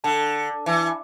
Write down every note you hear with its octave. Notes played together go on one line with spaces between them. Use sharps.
D3 A5
E3